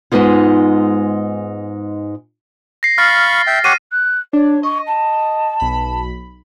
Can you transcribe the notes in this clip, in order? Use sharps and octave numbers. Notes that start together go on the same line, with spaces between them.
G#2 D3 G#3 B3 D#4 F4
A#6 C7
F5 B5 C#6 F6 A6
E5 G5
G4 C#5 F#5 C7 D#7
F#6
D4 C#5
D#5 C#6
A5
B1 B5